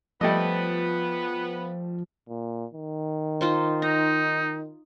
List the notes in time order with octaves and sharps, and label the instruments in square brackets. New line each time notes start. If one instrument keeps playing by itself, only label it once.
[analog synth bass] F3 [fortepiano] G3 A3 D#5 [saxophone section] B3 B4
[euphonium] A#2
D#3
[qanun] D#4 F4 C5
[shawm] D#4 [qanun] A#5